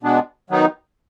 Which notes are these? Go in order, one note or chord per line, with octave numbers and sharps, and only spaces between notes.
B2 G#3 B3 D4
D#3 F#3 B3 D#4